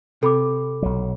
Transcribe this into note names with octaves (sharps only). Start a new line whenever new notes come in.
C3 A4 B5 D6
B1 F#3